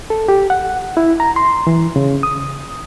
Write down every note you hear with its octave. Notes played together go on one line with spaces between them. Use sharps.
A4
G4
F#5
E4
A#5
C6
E3
C#3
D#6